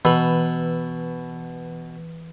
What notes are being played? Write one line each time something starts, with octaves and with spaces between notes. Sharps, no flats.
B2 E3 B4